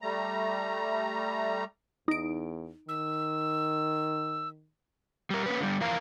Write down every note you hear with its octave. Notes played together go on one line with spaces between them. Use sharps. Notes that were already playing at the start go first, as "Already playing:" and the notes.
G3 A3 A#5
E2 D#4 D7
D#3 E6
G3 A#4
A#3 C#4 B4
D3 G3
F2 E3 A#4 F5 A#5